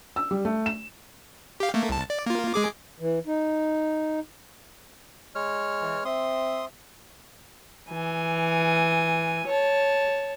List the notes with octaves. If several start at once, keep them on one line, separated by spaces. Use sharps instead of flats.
E6
G3
A3
E7
G4 F5
A3 A#3
C2 A5
D5
A#3 F4
G#3 G#4 D6
E3
D#4
G#3 C#5 F6
E3
C4 E5 C6 D#6
E3 G#5
C#5 A5